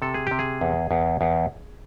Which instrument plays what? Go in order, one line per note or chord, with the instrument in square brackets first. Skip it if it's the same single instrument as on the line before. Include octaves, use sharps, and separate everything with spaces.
[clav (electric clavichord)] C3 A4
G#4
C3 G4
G#4
E2
E2
E2